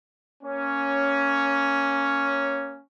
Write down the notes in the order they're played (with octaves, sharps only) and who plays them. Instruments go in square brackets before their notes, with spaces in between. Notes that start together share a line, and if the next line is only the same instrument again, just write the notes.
[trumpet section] A#3 C#4